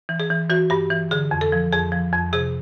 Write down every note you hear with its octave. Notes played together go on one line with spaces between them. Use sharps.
E3
G#4
E3
E3 F#4
G2 G4
E3
D3 G#4
F2
A4
F3
F2 G#4
F3
F2
C3 G#4